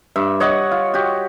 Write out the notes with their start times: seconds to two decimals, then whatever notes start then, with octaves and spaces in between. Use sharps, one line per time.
0.16 G2 E5
0.40 C#5 D#5 F#5
0.71 F4
0.94 F#4 G4